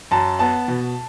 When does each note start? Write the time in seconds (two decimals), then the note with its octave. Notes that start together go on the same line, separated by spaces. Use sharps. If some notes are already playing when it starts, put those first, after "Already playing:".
0.11 F#2 A5
0.39 B3 A5
0.68 B2